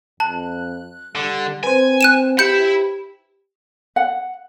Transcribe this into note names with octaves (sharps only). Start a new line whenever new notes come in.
F2 A5 F#6
D3 G3
C4 B4 C5 G#5
F#6 D#7 E7
E4 G4 B5 G6 C#7
F#5